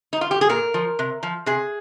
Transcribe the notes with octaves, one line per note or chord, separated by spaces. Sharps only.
D#4
F4
G4
G#4
A#2 A#4
F3
C3
F3
C3 G#4